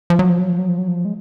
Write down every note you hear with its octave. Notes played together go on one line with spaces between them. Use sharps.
F3
F#3
F3
F#3
F3
F#3
F3
F#3
F3
G#3